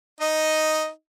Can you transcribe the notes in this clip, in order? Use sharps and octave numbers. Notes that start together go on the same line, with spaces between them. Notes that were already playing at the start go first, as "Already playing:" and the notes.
D#4 D#5